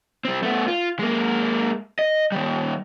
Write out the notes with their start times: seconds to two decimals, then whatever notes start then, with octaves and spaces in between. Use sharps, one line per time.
0.25 G3 C4
0.43 A3 B3
0.68 F4
0.99 G#3 A#3
1.99 D#5
2.32 D#3 G3